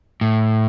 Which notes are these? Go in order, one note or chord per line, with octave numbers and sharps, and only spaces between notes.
A2